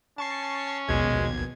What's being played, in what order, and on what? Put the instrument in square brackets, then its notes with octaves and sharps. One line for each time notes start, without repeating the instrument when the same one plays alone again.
[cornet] C#4 [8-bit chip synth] A5 C#6 C7
[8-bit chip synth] A#1 D#2 G#6 [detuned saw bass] B2 [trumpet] G#3